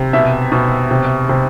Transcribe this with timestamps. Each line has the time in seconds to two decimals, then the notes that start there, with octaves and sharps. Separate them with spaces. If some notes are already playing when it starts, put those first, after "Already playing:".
Already playing: C3
0.13 B2 E5
0.52 B2
0.91 C3
1.29 C3